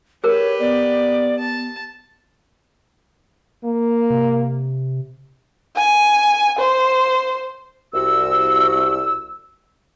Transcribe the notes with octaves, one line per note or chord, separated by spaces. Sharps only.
G4 G#4 A#4 B4 C#5
B3 D5
A5
A#3
C3
G#5
C5
C2 F#4 E6